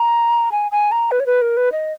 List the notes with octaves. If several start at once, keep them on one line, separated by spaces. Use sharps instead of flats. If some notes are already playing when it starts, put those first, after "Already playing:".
Already playing: A#5
G#5
G#5
A#5
B4
C#5
B4
A#4
B4
D#5